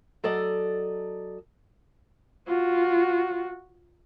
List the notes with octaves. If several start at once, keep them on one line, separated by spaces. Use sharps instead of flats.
F#3 A4 D5 D#5
F4 F#4